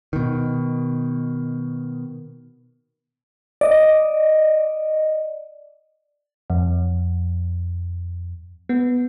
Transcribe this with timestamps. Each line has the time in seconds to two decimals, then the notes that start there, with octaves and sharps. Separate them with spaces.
0.13 B2 D#3
3.61 D5 D#5
6.50 F2
8.69 B3